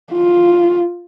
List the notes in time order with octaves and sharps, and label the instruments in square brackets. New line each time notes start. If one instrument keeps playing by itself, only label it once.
[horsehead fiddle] F4